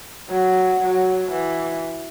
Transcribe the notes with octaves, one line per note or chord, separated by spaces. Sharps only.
F#3
F#3
E3